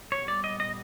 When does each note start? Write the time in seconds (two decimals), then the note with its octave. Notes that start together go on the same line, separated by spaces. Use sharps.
0.12 A#2 G3 B3 C#5
0.28 D5
0.44 D#5
0.60 D#5